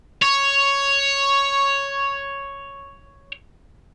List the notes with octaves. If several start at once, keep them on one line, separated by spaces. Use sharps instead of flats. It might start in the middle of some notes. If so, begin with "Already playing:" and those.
C#5